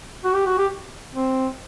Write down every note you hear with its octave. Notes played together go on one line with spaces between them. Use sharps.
F#4
G4
F#4
G4
C4